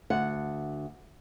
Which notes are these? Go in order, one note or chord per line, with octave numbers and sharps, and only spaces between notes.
D2 F#5